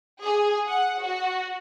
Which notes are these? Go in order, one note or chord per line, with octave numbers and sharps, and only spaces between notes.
G#4
F#5
F#4